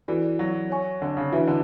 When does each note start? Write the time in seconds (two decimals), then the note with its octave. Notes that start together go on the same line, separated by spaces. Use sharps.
0.08 E3 F#4 A4 D5
0.39 F#3
0.70 C#5 G#5 C#6
1.02 D3
1.17 C#3
1.32 E3 D4 F#4 B4 E5
1.47 D3